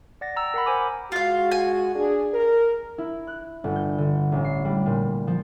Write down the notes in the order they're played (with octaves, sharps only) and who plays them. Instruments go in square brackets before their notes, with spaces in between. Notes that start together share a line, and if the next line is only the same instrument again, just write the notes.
[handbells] D5 F#5 A6 A#6
G5 A#5 E6
A#4 F#5 B5
C5 G#5 D6
[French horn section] G#3 F#4 [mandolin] F4 F5
[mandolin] G#5
[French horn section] D4 G#4
A#4
[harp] E4
F#6
G1
G6
D3
A1
C7
G3
A#2
F3